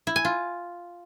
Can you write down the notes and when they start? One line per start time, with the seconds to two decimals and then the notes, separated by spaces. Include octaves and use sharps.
0.07 E4
0.16 G#5
0.25 F4